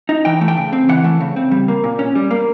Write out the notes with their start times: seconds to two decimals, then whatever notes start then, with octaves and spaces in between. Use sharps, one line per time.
0.09 D#4
0.25 E3 G5
0.41 A3
0.48 G5
0.57 C#3
0.73 C4
0.89 E3 F#5
1.04 A3
1.21 C#3
1.36 C4
1.51 G3
1.68 A#3
1.84 A#2
1.99 C#4
2.15 G3
2.31 A#3